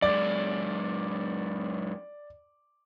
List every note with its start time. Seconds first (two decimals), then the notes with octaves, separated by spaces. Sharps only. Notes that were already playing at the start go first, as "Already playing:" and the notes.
0.02 F#2 G#3 D5